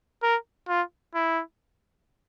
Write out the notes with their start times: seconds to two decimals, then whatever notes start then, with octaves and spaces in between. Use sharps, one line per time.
0.23 A#4
0.69 F4
1.15 E4